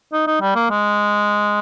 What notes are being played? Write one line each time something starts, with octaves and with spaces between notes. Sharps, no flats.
D#4
D#4
G3
A#3
G#3